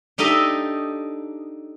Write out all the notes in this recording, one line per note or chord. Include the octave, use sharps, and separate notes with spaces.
D4 D#4 G4 A4 D#5 E5